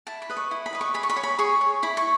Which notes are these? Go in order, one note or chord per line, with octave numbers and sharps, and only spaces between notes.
E4 A5
B5
B4 D#5
C#6
E4
B5
B4 D#5
C#6
G#4 B5
C#6
B5
C#5
B5
G#4 C#6
C#5
E4 B5
C#6